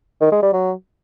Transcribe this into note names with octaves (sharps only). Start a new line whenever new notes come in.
D#3
G#3
G3
F#3